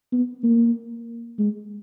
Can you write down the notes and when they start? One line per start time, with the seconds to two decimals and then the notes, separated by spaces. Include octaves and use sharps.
0.12 B3
0.44 A#3
1.38 G#3